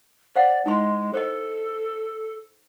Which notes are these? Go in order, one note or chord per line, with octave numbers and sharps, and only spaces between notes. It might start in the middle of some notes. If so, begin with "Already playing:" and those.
C5 D5 F5 F#5
G#3 D#4 E4 C6
A4 C5 D#5